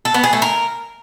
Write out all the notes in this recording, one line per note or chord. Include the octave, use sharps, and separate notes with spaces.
A4
B3
G#4
A3
A#4